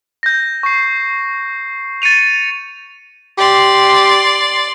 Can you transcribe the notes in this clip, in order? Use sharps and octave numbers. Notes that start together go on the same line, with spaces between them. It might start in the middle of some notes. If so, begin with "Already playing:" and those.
G6 A#6
C#6 C7
A6 C#7 D#7 F7
G4 D5 C6